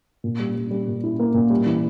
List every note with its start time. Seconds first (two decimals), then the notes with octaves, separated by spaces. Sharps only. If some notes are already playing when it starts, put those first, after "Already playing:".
0.24 A#2
0.39 G3
0.56 G3
0.71 G3
0.87 A#2
1.04 E4
1.19 A#3
1.34 A#2
1.50 G3
1.66 E3